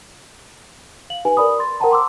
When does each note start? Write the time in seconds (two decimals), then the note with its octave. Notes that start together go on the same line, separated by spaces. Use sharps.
1.10 F5 F#7
1.25 D#4 G4 B4 G#5
1.37 A#4 D5 B5 D#6
1.59 C6 A6
1.80 A#4 C5 F#5 G5 A5 A#5
1.91 C6 D6 E6